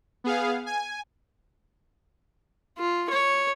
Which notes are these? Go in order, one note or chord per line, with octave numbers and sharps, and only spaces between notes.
B3 G#4 F5
G#5
F4
C#5